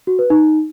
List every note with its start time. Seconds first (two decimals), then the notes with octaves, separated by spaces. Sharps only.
0.07 F#4
0.19 B4
0.30 D#4